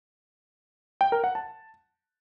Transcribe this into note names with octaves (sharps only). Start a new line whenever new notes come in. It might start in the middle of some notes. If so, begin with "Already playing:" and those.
G5
A#4
F#5
A5